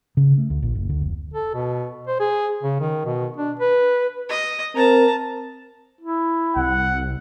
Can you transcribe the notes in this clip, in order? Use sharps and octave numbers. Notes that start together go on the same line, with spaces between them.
C#3
A3
D2
A#1
F#1
D2
F1
A4
B2
C5
G#4
C#3
D#3
B2
D4
B4
D#5
C4 A#4 A5 A#5
E4
C2 F#5